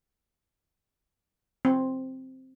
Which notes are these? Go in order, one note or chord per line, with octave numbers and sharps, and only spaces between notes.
C4